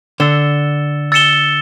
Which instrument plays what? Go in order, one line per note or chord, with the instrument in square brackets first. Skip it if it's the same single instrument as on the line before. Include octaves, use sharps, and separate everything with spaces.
[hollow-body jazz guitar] D3 [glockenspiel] E6 A6 C#7 E7 G7
[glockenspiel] E6 A6 C#7 E7 G7